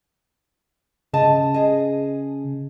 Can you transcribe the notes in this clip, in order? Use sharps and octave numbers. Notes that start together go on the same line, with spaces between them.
C#3 D#5 A5
G#4 D#5